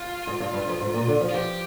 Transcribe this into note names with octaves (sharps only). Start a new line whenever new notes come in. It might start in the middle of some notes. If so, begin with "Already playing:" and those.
Already playing: F4
G#2
G2
G2
F2
G#2
A#2
D3
F3
F4
F3 G4